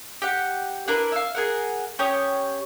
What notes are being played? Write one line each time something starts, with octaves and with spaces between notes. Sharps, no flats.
G4 F#5
D4 E4 A#4 B4
E5 F5
G#4 A#4 F#5
C#4 G4 C#5 D#6